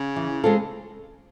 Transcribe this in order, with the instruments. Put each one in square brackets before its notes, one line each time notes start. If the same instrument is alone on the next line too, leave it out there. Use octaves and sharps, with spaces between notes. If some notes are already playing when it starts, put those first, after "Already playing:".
Already playing: [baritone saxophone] C#3
[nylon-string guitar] E3
G#3 C4 F4 A4